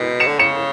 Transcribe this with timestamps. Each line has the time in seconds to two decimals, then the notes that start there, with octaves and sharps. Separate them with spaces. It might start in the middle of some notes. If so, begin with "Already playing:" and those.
Already playing: B2 G6 B6
0.20 C#7 E7
0.28 D3
0.39 C#3 C#7 E7